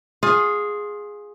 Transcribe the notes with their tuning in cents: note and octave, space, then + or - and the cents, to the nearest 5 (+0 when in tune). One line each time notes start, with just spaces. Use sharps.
F4 +20 G#4 +0